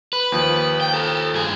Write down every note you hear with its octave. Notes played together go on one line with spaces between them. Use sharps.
B4
D#2 F3
G5
A4 A#5
G2 G#4